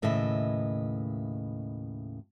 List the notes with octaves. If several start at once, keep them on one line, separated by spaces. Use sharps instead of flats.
D#2 A2 C#3 B4 D#5 E5